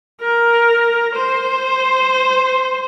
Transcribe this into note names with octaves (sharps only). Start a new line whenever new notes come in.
A#4
C5